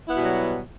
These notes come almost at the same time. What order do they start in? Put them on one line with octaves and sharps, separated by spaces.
E4 B3 B2 G3 F#3